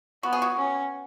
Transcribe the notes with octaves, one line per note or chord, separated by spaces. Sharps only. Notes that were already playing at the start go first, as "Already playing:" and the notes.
B3 F#4
G#4
F#4
C#4